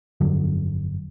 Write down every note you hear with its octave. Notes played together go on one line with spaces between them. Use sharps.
G1 F2 D3 F#3